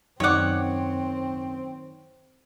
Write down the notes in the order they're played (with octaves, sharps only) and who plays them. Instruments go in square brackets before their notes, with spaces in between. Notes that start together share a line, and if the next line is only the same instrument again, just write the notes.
[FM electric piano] F#2 [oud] D#3 D5 [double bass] C4 [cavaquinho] C#5 F#5